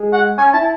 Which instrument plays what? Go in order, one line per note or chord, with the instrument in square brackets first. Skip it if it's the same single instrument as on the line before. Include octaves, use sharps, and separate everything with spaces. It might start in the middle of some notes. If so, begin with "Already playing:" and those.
Already playing: [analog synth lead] G#3
[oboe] F#5
[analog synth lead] C#4 [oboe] G#5
[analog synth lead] E4 [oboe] A5